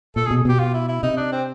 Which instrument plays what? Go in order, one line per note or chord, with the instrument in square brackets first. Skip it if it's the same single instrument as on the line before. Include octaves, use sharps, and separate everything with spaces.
[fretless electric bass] A#2 [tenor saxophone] A4
[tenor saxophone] G#4
[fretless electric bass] B2
[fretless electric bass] B2 [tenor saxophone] G4
[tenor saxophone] F4
E4
E4
[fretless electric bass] C3 [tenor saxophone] D#4
[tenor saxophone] D4
C4